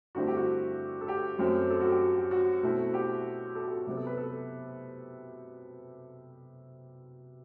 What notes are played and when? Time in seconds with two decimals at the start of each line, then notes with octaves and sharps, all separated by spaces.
0.15 G2 D3 A3 C4 E4 F#4
0.27 G4
0.37 F#4
1.01 A4
1.08 G4
1.38 F#2 F#3 A3 C4
1.70 A4
1.81 F#4
1.91 G4
2.01 F#4
2.16 G4
2.31 F#4
2.63 B2 A3 C4 E4
2.94 G4
3.55 A4
3.66 G4
3.76 F#4
3.87 C3 F#3 B3 G4
3.97 A4
4.07 B4
4.17 A4